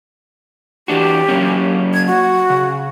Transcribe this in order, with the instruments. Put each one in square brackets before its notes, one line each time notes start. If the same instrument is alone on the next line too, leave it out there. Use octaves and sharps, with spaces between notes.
[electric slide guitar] E3 D4 F#4 [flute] G4
[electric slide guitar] F#3 A#3 C#4
[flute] G#6
F#4
[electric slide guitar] C#3